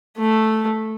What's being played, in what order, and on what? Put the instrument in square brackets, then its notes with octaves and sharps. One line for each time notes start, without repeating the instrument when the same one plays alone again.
[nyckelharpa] A3